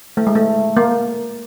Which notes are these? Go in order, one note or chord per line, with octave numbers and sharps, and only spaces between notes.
A3
G#3
A3
A#3